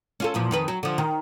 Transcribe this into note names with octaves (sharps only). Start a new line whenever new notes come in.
C#4 F4 A4
E2 A#2 F3
F2 D#3 B4
F#3
D3 F3
D#3